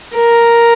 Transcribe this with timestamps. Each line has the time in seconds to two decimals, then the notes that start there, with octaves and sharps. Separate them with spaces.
0.16 A#4